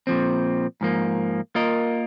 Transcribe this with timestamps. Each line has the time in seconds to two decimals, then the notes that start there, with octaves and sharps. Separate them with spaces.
0.07 A#2 F3 C4
0.81 G#2 F3 A#3
1.55 A#3 F4 A#4 D#5